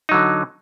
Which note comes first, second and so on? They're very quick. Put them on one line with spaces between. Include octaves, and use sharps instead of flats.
D#4 F#3 D3